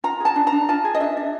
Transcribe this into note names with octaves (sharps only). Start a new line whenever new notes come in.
F4 A#5
G#4 A5
D4
A#5
D4
F4 A5
G#4
D#5
D4 E5
D4